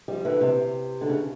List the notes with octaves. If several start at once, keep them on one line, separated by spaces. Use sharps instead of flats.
F3 G3
D3 E3
C3
D3
C#3